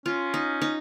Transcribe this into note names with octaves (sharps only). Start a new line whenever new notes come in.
C#4 F4
D#4
D#4